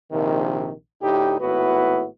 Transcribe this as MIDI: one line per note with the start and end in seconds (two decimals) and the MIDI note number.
0.12 0.70 34
0.12 0.70 48
0.12 0.70 51
1.02 1.37 38
1.02 1.37 45
1.02 1.37 63
1.02 1.37 67
1.40 2.06 32
1.40 2.06 45
1.40 2.06 59
1.40 2.06 64
1.40 2.06 66
1.40 2.06 71